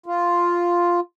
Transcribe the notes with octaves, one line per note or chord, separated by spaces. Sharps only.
F4